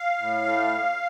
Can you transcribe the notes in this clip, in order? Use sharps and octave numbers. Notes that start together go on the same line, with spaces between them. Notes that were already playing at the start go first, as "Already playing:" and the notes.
Already playing: F5
A2
A3